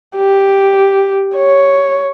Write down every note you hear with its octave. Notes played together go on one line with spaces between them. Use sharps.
G4
C#5